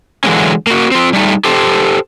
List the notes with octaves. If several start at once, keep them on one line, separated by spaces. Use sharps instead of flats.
D3 E3 F#3 G#3 A#3 C#4
A#3 F#4
C4 F4
G3 A3 D#4
G4 A4 C5